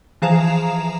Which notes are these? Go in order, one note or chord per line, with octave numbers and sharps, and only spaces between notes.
E3 F3 G#4 F5 A#5 E7